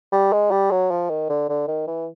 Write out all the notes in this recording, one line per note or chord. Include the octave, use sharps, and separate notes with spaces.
G3
G#3
G3
F#3
F3
D#3
D3
D3
D#3
E3